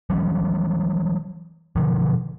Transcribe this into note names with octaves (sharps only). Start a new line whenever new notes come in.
E3 F#3 G3 C#4
B2 D3 D#3 F3